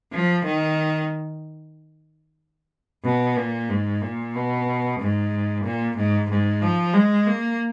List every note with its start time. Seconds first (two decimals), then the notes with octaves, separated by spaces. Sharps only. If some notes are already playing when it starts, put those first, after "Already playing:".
0.13 F3
0.44 D#3
3.04 B2
3.37 A#2
3.70 G#2
4.02 A#2
4.35 B2
4.99 G#2
5.64 A#2
5.97 G#2
6.29 G#2
6.62 F3
6.94 G#3
7.26 A#3